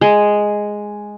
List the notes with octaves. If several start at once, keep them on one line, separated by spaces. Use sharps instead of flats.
G#3